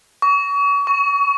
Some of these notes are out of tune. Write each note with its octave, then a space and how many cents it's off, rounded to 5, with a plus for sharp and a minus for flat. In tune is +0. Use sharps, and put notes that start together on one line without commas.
C#6 +35
C#6 +15